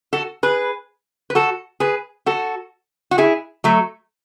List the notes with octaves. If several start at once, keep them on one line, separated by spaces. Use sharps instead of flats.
F#4 A4
G#4 B4
B4
F#4 A4
G#4 B4
F#4 A4
F#4
E4 G#4
F#3 A3